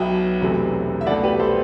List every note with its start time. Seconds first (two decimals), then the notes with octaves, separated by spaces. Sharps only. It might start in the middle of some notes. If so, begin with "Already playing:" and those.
Already playing: B1 B2 F#3 B3 E5 G5
0.41 E1 E2 C3 F#3 A3
1.01 E5
1.06 C2 B2 A3 D5 F#5
1.23 G4 B4
1.40 A4 C5